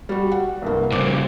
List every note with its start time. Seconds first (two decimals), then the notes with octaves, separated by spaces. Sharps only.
0.09 G3 F#4
0.32 F#5
0.62 C2 G2 A#3
0.92 G2 C#3 C5 D6